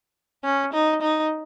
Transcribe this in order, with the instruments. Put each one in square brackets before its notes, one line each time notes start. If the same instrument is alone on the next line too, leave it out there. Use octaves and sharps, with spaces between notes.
[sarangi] C#4
D#4
D#4